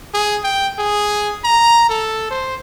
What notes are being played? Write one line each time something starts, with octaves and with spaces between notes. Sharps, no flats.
G#4
G5
G#4
A#5
A4
C5